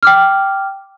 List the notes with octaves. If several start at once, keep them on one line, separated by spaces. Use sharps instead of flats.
G5 D6 F6